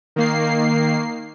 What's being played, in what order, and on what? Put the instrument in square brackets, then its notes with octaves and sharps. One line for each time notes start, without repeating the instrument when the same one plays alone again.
[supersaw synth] D#3 A#3 C7